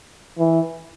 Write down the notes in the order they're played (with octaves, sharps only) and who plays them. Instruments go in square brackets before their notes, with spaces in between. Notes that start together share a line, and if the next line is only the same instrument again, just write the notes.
[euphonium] E3